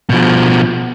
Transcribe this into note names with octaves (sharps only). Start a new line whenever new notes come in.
B2 F3